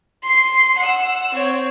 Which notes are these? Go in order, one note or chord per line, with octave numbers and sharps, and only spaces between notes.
C6 C7
F#5 E6
C4 C#5